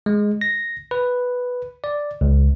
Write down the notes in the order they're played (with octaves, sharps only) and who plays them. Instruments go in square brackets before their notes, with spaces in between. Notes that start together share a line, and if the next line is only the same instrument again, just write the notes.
[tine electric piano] G#3
A#6
B4
D5
C#2